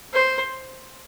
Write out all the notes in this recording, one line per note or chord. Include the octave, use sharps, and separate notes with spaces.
C5